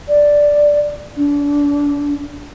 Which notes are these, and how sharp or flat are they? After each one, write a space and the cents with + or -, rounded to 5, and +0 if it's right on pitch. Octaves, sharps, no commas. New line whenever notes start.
D5 +0
D4 -30